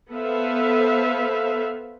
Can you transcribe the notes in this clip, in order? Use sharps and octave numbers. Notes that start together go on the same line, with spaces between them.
B3 A4 B4 C5 E5 F5